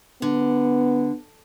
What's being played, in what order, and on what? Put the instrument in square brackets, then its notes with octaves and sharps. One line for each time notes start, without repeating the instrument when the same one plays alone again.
[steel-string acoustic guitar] D3 [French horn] B3